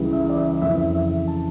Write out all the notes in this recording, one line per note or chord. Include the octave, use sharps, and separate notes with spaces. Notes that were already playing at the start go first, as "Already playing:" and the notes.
Already playing: C#2 C#3 E3 G3
E5
D5
E5
F2 C#3 E3 E5
E5
E5
A5